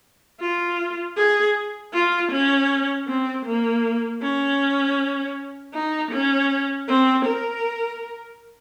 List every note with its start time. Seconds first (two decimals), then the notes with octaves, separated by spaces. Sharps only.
0.41 F4
1.17 G#4
1.94 F4
2.32 C#4
3.08 C4
3.46 A#3
4.22 C#4
5.74 D#4
6.12 C#4
6.88 C4
7.26 A#4